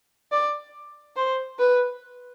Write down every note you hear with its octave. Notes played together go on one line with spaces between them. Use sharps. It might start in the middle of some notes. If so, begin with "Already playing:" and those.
D5
C5
B4